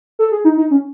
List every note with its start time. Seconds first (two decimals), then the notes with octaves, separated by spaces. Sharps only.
0.19 A4
0.32 G#4
0.45 D#4
0.57 D#4
0.71 C#4